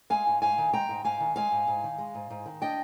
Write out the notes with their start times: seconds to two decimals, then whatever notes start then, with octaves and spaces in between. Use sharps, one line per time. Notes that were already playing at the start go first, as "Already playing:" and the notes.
0.10 G#3 F5 G#5
0.27 G#2
0.42 G#2 F5 G#5
0.58 D#3
0.73 G#3 G5 A#5
0.89 G#2
1.04 G#2 F5 G#5
1.20 D#3
1.36 G#3 F5 G#5
1.52 G#2
1.67 G#2
1.84 D#3
1.98 G#3
2.15 G#2
2.30 G#2
2.46 D#3
2.62 D4 D#5 G5